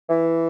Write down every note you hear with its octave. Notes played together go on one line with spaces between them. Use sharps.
E3